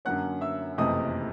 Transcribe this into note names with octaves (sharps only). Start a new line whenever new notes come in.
F#2 D3 F#3 A#3 C#4 F#5 F#6
E5 E6
F#1 F2 C3 E3 A3 D#5 D#6